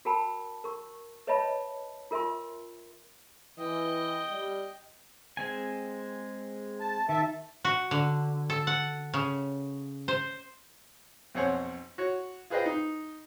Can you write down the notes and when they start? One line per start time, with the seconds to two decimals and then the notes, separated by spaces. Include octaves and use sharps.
0.05 F#4 A#4 G5 A5 B5
0.64 A#4 C#6
1.27 B4 C#5 D#5 E5 A5 B5
2.11 F4 A#4 E5 G#5 C6
3.58 E3 D#5 G5
4.31 G3
5.37 G#3 C4 G#5
6.80 A5
7.09 D#3 E5 A5
7.65 F#4
7.91 D3
8.50 A4
8.67 F#5
9.14 C#3
10.08 C5
11.35 B1 F2 C5 C#5 F#5 G#5
11.98 F#4 C#5
12.50 F4 G#4 B4 C5 D#5 G5
12.66 D#4